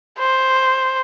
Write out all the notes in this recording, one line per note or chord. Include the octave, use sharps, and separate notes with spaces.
C5